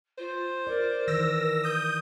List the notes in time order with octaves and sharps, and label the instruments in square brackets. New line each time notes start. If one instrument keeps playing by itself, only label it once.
[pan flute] F4 [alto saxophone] C5
[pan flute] A#4 [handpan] D5
[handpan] D#3 E3 [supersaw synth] E6 A#6
[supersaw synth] D#6 G6